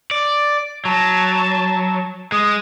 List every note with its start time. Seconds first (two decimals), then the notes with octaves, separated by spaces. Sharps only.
0.11 D5
0.85 F#3 A5
2.32 G#3 D#6